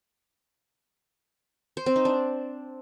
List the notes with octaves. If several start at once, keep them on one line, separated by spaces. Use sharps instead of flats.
C5
C4
D#4
D4